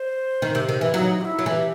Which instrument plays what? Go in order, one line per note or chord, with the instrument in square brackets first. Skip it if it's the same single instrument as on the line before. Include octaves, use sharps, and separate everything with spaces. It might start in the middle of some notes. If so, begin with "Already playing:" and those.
Already playing: [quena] C5
[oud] D#3
C3
D#3
E3
[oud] F#3 [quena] E4
[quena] D#4
G4
E4
[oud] F#3
[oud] E3 [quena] A4
[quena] G4